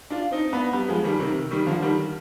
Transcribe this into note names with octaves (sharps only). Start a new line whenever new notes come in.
D4 F4
C4 D#4
B3 D4
G3 B3
F3 G#3
D#3 G3
C3 D#3
D#3 G3
D3 F3
D#3 G3